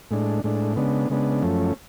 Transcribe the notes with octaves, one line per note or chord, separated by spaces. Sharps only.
A2 G#3 D4
A2 G#3 D4
C#3 G#3 B3 D4
C#3 G#3 B3 D4
F#2 F3 A3 C#4